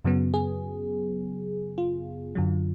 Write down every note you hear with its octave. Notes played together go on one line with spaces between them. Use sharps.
F#2 C#3 F#3 B3
G#4
F4
F#2 D3 F#3